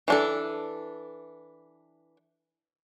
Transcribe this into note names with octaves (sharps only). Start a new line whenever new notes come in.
E3 D4 A4